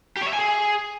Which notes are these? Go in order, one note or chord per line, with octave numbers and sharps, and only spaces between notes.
G4
C#5
E5
G#5
G#4